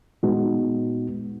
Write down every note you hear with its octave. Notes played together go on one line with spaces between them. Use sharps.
A#2 G#3 B3 D#4 F#4